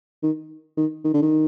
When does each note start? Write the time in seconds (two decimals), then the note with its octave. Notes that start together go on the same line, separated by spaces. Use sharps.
0.23 D#3
0.77 D#3
1.04 D#3
1.14 D3
1.22 D#3